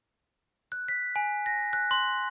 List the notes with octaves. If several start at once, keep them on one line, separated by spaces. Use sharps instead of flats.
F#6
B6
G#5
A#6
F#6
C6